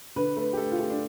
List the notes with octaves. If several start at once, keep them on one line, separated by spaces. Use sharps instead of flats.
D3 B4
A3 B4
G4
A3 A4
F4
A3 G4
D4